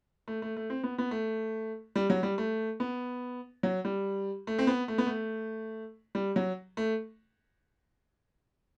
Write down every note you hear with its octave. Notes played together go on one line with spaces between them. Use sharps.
A3
A3
A3
C4
B3
B3
A3
G3
F#3
G3
A3
B3
F#3
G3
A3
C4
B3
A3
B3
A3
G3
F#3
A3